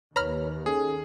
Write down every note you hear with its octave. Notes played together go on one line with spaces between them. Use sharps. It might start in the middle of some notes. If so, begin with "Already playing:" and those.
D#2 B4 C#5 A#5 B5 F6
C#4 D#4 G#4 A4